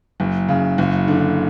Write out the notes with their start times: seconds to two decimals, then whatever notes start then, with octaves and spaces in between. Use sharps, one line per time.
0.20 F#1
0.48 C#3
0.78 F#1
1.08 D3